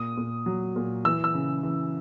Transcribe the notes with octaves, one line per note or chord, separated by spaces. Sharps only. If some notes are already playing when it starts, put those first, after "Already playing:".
Already playing: A#2 D#6
A#2
F#3
A#2
E3 E6
E6
C#3
E3